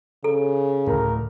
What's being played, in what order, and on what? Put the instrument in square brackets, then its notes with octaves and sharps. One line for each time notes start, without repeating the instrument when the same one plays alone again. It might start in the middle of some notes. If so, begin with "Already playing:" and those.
[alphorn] C#3 [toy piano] A4
[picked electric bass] D2 A2 [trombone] A#4